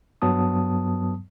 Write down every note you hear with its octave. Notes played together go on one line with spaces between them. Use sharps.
G2 F#3 B3 A5 D#6